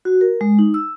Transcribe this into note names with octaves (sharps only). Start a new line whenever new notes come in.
F#4
A#4
G#3
D#4
E6